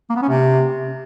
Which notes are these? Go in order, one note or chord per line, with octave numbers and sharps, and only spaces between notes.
A#3
B3
C#4
C3